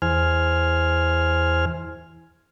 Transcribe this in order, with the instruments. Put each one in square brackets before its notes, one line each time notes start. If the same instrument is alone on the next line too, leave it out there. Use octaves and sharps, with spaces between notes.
[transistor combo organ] E2 C5 G#5 F6